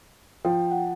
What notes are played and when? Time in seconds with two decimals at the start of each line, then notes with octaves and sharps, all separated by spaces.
0.45 F3 G5
0.71 F#5